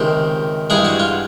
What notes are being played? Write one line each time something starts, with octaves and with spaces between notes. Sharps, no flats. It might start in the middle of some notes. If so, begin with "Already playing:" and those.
Already playing: C#2 C3 D#3 C5
G2 E3 G#3 G#4
F#4
F4